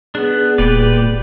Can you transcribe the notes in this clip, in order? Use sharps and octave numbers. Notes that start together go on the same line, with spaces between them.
B3 D4 G#4
D#1 A#2 G4 B4 D5